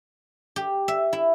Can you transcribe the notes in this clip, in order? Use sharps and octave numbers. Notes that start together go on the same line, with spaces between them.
G4
E5
E4